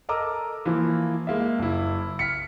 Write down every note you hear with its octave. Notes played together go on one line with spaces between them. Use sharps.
A4 A#4 D#5 A#5 D6 E6
E3 F3 A#3
G#3 A#3 E5
F#1 E4
F6 B6 C#7